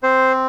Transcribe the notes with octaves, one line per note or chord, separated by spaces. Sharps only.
C4 C5